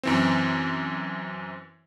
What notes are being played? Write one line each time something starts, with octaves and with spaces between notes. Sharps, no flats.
F#2 E3 C4